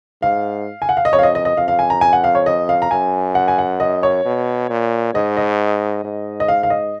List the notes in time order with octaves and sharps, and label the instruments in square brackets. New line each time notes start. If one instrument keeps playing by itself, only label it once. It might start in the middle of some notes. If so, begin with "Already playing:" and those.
[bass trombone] G#2 [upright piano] F5
[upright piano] G#5
F#5
F5
D#5
[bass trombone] F2 [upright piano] C#5
[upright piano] F5
D#5
D#5
D#5
[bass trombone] F2 [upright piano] F5
[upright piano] F5
G#5
A#5
G#5
F#5
F5
C#5
D#5
F5
A#5
[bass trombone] F#2 [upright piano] G#5
[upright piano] F#5
G#5
F#5
D#5
C#5
[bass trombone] B2
A#2
[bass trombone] G#2 [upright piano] D#5
[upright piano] D#5
[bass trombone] G#2
[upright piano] D#5
F5
F5
D#5